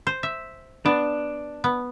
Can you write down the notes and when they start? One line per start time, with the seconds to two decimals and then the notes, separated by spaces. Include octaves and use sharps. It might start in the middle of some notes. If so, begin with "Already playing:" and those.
0.07 C5
0.23 E5
0.86 B3 D4
1.64 B3